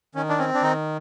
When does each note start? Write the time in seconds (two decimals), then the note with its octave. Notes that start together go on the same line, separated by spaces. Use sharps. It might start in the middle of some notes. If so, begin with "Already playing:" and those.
0.15 D#3 C#4
0.29 D4
0.38 C4 C#4
0.54 D4
0.62 D#3 D#4